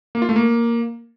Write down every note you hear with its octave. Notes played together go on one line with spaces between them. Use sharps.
A#3
F4
A3
A#3